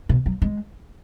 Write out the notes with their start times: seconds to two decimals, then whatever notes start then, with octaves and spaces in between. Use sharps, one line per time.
0.09 B2
0.26 F#3
0.42 G#3